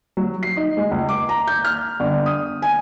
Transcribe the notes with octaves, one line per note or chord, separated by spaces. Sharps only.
F#3
C7
D#4
G#3
C#2
D6
A#5
G6
F6
G1
D#6
G#5